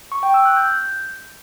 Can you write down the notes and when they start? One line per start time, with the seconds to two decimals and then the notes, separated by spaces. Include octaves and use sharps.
0.12 C#6
0.23 G5
0.34 E6
0.45 F#6
0.57 G6